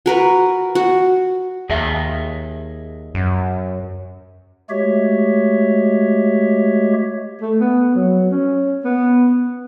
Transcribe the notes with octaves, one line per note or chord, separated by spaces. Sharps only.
F#4 A#4 B4
F#4
D#2 G#4 D#5 E5
F#2
G#3 A3 F#4 G4 C#5 E5
A3
B3
F#3
C#4
B3